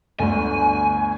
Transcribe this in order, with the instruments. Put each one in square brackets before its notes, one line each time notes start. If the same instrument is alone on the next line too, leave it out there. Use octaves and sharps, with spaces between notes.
[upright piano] G1 D2 [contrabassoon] D3 [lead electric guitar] G#5